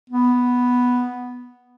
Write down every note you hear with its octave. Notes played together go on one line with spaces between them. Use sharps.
B3